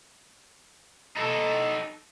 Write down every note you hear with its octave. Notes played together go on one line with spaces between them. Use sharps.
D#4 A4